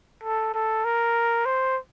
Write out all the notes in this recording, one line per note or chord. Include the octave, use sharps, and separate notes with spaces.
A4
A4
A#4
C5